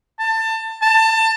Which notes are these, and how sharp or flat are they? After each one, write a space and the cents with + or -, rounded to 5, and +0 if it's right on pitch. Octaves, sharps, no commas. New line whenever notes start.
A5 +25
A5 +20